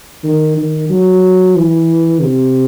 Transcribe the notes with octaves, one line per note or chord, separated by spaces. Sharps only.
D#3
D#3
F#3
E3
C3